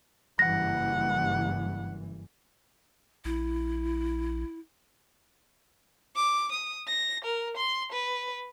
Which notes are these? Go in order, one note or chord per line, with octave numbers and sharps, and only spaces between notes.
F#1 G2 E3 F#5 A#6
A#1 E4
D6
D#6
A#6
A#4
C6
B4